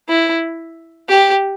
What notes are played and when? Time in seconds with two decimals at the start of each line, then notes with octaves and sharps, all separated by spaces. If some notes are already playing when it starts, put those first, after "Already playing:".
0.09 E4
1.09 G4